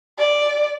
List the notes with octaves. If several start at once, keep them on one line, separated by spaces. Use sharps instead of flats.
D5